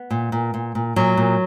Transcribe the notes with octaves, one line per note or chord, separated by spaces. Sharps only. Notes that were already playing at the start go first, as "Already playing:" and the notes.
Already playing: B3
A#2
A#2
A#2
A#2
A#2 F#3
A#2